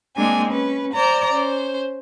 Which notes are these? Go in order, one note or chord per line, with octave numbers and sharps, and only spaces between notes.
G#3 A#3 C4 D4 G#5
C#4 B4
C5 D5 A#5
C#4 C5